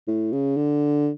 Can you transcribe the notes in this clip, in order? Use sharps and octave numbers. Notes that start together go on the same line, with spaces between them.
A2
C#3
D3